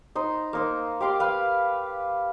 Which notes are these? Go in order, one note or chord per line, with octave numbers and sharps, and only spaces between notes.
D#4 C5
A#3 D#4 C5
G4 F5 C6 D6
B4 F5